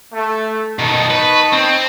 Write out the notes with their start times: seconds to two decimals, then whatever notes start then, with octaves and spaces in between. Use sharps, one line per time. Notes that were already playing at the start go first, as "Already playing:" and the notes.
0.13 A3
0.79 B2 D#3 D#4 A5 C#6
1.11 B4
1.53 C4